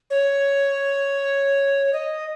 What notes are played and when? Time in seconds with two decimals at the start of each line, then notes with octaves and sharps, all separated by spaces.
0.10 C#5
1.93 D#5